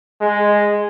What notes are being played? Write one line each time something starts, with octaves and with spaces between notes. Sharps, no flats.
G#3